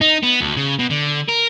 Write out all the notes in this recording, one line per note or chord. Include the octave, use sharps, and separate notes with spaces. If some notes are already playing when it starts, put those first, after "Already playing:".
D#4
B3
D2
C#3
B2
D3
A#4